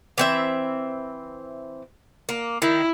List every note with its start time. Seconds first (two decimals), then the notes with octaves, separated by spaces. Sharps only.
0.18 E3 C4 E5
2.29 A#3
2.62 D#3 E4